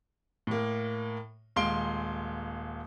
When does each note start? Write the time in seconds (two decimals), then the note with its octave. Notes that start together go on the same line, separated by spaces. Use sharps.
0.47 A2 A#3
1.56 D#1 G#3 F5 C6 D7 G7